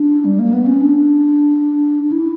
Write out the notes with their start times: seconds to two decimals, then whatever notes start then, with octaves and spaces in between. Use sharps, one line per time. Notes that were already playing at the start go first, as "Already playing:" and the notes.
Already playing: D4
0.25 G3
0.39 A#3
0.53 B3
0.66 C#4
0.80 D4
2.04 D4
2.12 E4